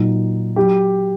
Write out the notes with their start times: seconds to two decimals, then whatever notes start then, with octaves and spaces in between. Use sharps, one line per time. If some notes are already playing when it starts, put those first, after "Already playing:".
Already playing: A#2 F#3 D#4
0.56 F#3 G4